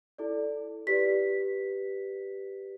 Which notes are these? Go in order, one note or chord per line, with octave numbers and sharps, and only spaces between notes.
E4 A4 D5
G4 B4 D5 B6